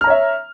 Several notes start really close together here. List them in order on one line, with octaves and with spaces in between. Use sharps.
F6 A#5 C#5 E5